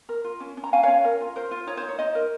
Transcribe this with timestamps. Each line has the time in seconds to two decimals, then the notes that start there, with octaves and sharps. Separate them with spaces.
0.09 A#4
0.24 F4
0.40 C#4
0.57 C#4
0.64 A#5
0.73 C#4 F5 G#5
0.83 C#4 C#5 F5
1.05 A#4
1.21 F4
1.36 A#4 C5
1.51 F4
1.67 D#4 C#5
1.77 C5
1.83 D#4
1.88 C#5
1.99 D#4 C5 D#5
2.15 A#4